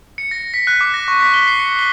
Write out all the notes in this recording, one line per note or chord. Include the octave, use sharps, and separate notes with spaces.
C#7
A#6
B6
F#6
D6
A#6
C#6
B6
G7
C7
C#7
G7